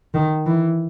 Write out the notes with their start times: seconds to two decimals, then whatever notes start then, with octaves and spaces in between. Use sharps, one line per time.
0.14 D#3
0.46 E3